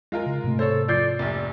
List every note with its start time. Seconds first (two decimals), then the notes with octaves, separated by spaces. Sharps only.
0.12 G#3 F4 A#4
0.26 C#3
0.44 G#2 C3 A3
0.59 A4 C5 C#5
0.88 F3 D5 G6 C7
1.19 F1 A#1 D5